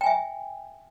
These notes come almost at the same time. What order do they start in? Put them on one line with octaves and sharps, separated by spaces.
G5 G#5 E5